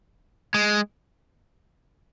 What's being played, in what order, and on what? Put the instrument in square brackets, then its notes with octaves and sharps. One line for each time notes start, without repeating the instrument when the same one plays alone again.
[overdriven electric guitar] G#3